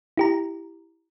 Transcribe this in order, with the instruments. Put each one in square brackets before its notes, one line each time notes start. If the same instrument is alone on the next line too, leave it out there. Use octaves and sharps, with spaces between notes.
[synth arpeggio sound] E4 G4 A#5